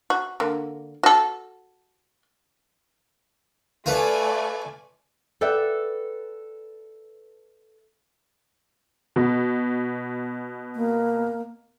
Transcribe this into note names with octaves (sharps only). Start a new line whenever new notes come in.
F#4
D3 A#3
F#4 A4
A3 F4 B4 D5 G#5
A4 B4 D5 E5 F#5 G5
B2
A#3